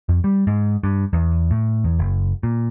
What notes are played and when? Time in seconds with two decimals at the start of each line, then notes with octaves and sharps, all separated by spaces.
0.09 F2
0.24 G3
0.47 G#2
0.83 G2
1.13 E2
1.51 A2
1.84 E2
1.99 F#1
2.43 A#2